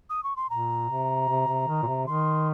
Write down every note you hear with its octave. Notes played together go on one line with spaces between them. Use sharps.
D#6
C#6
C6
A#2 A#5
C3
C3
C3
D#3
A#2
C3
D#3 C6